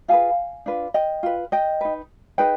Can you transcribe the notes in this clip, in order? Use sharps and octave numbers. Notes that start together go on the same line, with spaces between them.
F4 G#4 B4 F5 G#5
D4 F4 B4
D#5 G5
F4 B4
D#5 G5
D#4 B4
D#4 G#4 B4 D#5 G5